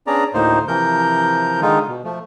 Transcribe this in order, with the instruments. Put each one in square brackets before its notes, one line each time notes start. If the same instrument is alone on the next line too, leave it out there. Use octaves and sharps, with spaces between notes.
[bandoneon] B3 C#4 D4 G#4 D5 A#5
D2 A2 A#3 D#4 C5
C3 E3 F3 A#4 G6
D3 D#3 G#3 D#4 F4
B2
F3 A3